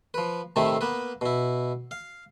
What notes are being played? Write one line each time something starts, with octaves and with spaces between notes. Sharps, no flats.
F3 B4
A2 C3 D#3 A3 E4
A#3 B3 B4
B2 E4
F5